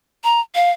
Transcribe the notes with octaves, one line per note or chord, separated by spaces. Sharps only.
A#5
F5